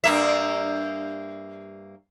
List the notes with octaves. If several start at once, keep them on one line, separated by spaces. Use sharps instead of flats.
G2 A#3 E5